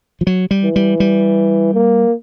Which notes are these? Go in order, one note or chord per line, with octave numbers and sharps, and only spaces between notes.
F3
F#3
G3
E3
G3
G3
A#3